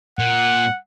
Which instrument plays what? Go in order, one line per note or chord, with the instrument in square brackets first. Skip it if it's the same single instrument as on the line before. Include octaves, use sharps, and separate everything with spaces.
[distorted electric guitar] A#2 [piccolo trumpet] F#5